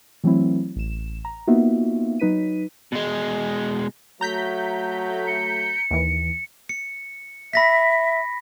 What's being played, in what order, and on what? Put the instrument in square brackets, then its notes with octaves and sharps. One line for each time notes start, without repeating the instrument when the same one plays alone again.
[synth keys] E3 F#3 A3 C4 E4
A1 E7
A#5
A#3 B3 D#4 F4 F#4 E5
F#3 D#4 B4 B6 D#7
[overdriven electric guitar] B2 G#3
[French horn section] F#3 A3 [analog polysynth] A#5 G6 B6
[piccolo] C#7
[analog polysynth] D#2 E3
[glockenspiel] C#7
[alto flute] E5 [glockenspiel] B5 A#6 B6